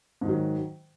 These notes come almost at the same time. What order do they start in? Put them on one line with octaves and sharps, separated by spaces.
G#2 D#3 F#3